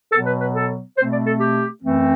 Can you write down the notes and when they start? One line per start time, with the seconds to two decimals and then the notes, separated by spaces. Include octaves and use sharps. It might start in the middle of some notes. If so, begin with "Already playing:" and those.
0.12 B2 F#3 B3 A4
0.26 B4
0.40 B4
0.55 A4
0.97 B2 A3 C4 C5
1.12 D5
1.26 A4
1.40 G4
1.82 F#2 E3 A3 C4